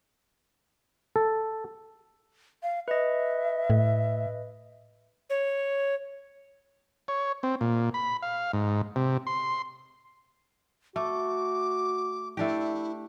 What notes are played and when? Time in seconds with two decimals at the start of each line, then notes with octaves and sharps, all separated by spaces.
1.16 A4
2.63 F5
2.88 B4 D#5 E5
3.70 A2
5.30 C#5
7.08 C#5
7.43 C4
7.61 A#2
7.94 B5
8.22 F5
8.53 G#2
8.96 C3
9.27 C6
10.96 A3 F#4 D6
12.37 A3 D4 E4 G4